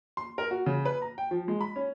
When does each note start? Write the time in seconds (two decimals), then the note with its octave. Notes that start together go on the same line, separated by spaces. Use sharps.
0.17 C6
0.38 A#4
0.51 F#4
0.66 C#3
0.85 B4
1.02 A#5
1.18 G5
1.31 F3
1.48 G#3
1.61 B5
1.76 C#4